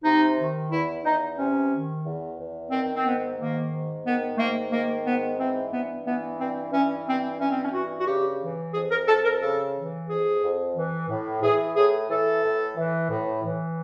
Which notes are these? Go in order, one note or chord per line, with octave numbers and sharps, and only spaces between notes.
C3 D#4
D#3
E2 E4
E2 D#4
C3 C#4
D#3
E2
E2
D#3 C4
C4
G#2 B3
D#3 A#3
G#2
D#3 B3
A3
G#2 A#3
D#3 A#3
G#2 B3
E3 C4
G2 B3
E3 B3
G2 C4
E3 C#4
G2 C4
E3 C#4
C4
C#4
G2 F#4
F#4
C#3 G4
E3
F2 G#4
A#4
F2 A4
A#4
C#3 A4
E3
F2 G#4
F2
E3
A2
E3 G#4
A2 G#4
E3 A4
A2
E3
A2
E3